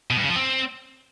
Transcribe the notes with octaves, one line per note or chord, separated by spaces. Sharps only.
B2
G2
C#3
F3
C4